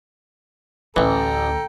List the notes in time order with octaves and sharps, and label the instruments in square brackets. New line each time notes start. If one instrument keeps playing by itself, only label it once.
[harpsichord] A1 [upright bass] D2 [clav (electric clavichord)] E3 [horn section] A4 G5 A#5